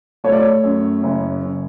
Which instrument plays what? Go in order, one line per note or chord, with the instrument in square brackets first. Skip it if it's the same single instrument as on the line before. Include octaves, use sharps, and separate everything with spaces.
[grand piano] A3 [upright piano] C#5
[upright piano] D5
C#5
[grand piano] F#2
F#1
F#1